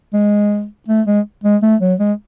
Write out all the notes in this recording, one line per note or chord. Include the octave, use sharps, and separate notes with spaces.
G#3
A3
G#3
G#3
A3
F#3
G#3